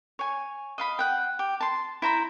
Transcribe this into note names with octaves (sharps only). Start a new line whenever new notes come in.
C#5 G#5
D#5 F5 B5
F#5 G5
G4
A5 C6
E4 C5 A#5 B5